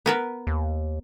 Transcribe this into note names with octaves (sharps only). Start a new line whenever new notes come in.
B3 A#4 B4
D#2